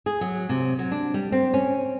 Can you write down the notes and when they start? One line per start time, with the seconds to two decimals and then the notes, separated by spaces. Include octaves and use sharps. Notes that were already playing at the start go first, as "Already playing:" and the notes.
0.06 G#4
0.21 F#3
0.49 C3
0.79 F#3
0.91 D4
1.14 G3
1.32 C4
1.54 C#4